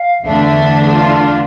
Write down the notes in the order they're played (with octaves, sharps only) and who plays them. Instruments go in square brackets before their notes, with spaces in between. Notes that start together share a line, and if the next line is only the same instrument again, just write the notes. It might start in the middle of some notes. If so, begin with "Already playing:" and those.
Already playing: [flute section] F5
[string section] E2 D3 A3 D4 [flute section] E5
[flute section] G#4
F4
E4
F4